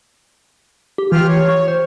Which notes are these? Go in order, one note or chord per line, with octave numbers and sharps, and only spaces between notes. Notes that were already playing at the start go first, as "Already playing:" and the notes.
G4
E3 F4 G4 F6
C#5
C#6
C5